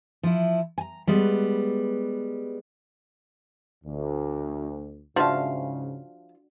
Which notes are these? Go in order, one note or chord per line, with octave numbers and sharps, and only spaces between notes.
F3 E4
G#5 A#5
G3 G#3 B3 B4
D2
G#2 C#3 F3 D4 F#4 E5 F5 A5